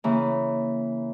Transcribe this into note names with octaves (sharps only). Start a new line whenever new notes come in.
C#3 E3 A#3